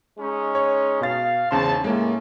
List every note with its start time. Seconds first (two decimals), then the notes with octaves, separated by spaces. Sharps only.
0.19 G#3 C#4 D#4
0.55 C#5
1.01 B2 F5 A6
1.51 E2 G#2 C#3 A5 C6
1.84 A2 G#3 A#3 C#4